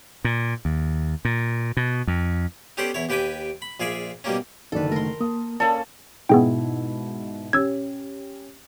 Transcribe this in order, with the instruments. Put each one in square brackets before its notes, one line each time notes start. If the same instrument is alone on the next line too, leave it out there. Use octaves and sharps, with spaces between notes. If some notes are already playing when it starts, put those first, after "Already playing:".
[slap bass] A#2
D#2
A#2
B2
F2
[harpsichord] B3 C#4 G4 A4 C5 D5
E2 E4 C#5
D#2 G4 B4 G5 G#5 D6
B5
A#1 F4 G#4 D5 E5 G#5
B2 G3 A#3 C#4
[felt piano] F#1 D3 D#3 [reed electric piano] D#4 D5 [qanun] A4 B4
[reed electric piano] A3 [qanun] A#4 C6
[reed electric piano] A#3 [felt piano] A5 D#6
[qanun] A#3 C#4 [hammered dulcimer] A4 [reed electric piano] D5
[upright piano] G#2 B2 E4 [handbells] B3 G#4 G5
[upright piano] C#4 G4 [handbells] E6 G#6